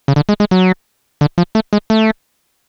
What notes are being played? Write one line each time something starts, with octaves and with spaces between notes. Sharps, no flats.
C#3
D3
G#3
G#3
F#3
D3
F3
A3
G#3
A3